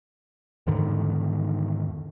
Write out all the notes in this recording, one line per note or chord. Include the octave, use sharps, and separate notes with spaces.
E2 G#2 D3 D#3